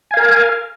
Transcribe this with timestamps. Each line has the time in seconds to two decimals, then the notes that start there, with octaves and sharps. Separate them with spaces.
0.11 G#5
0.14 F5
0.17 A#4